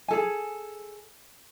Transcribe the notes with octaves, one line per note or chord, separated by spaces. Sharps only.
G#4 A4 G#5